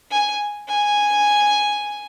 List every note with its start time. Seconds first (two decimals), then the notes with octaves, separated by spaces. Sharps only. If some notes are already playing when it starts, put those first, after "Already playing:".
0.11 G#5
0.68 G#5